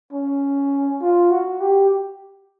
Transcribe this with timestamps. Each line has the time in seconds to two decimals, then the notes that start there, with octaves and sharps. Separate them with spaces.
0.12 C#4
1.01 F4
1.31 F#4
1.61 G4